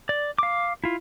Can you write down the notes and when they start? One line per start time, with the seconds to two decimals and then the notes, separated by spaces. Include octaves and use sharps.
0.09 D5
0.38 F5 D6
0.84 E4 F4